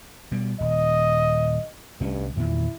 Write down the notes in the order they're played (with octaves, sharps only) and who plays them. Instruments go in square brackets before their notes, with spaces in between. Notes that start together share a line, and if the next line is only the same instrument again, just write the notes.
[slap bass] B2 G3
[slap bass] D#1 [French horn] D#5
[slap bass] C2 A3 C#4 [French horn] G2
[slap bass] E2 A#2 D#3 [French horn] E4